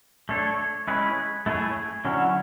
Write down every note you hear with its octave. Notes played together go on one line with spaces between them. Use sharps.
A3 D4 A4 C#5
G#3 C#4 E4 G#4 B4
A3 E4 G#4 C#5
D3 F#3 C#4 E4